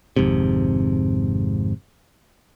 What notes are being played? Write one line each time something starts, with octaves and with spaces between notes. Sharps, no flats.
G#1 F2 G#2 C3